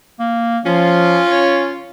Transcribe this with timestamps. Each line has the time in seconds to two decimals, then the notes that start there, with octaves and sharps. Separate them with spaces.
0.20 A#3
0.65 F3 C#4 F4
1.30 C#5